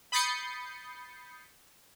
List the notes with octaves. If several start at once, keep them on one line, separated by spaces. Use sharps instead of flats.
B5 D#6 G6 A6 C7 C#7